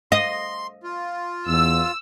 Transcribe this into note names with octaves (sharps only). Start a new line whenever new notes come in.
D#5 C6
F4
E2 E6